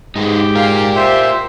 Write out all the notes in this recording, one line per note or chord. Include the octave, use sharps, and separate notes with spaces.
G#2 D#4 G4 G#4 B4
F4 A#4 F5
C5 E5